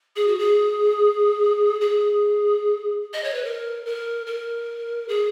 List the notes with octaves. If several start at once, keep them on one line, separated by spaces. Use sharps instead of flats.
G#4
F#4
G#4
G#4
D#5
C#5
B4
A#4
A#4
A#4
G#4